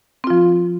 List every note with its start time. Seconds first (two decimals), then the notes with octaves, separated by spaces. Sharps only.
0.24 C4
0.27 F4
0.30 F3